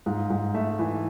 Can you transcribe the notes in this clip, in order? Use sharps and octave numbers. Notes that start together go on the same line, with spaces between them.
G#2 F5
G#2
A3 E5
E3